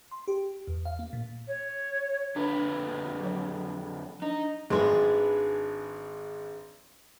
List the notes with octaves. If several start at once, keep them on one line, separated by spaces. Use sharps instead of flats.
C6
G4
E2
F5
A#3
A#2
C#5
F2 D3 D4 B4 C#5
F#3 C#5
D4 D#4
G#1 G#3 D4 G#4 B4 C6